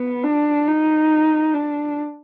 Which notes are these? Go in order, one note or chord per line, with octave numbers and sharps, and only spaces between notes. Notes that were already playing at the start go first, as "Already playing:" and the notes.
Already playing: B3
D4
D#4
D4